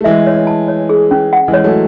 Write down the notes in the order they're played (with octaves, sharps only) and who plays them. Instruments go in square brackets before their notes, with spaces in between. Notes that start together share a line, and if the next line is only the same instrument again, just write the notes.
[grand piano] A3
[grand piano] E3 G#3 [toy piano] E5
[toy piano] C#5
A5
C#5
G#4
C#4
F#5
[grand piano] E3 G#3
[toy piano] C#5
[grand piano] F#3 A3